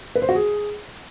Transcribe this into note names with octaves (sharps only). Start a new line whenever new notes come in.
B4
C5
F#4
G#4